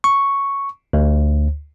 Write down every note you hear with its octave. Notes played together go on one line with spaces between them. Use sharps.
C#6
D2